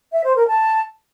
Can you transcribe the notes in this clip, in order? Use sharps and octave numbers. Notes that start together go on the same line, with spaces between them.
E5
C5
A#4
A5